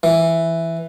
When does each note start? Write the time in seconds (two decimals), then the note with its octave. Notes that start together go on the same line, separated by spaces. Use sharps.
0.03 E3